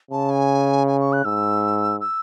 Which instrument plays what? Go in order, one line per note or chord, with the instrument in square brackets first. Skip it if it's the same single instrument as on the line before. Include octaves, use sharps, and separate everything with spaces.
[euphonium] C#3 [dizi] A5
[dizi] G#5
G#5
C#6
F#6
[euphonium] G#2 [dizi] E6
[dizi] E6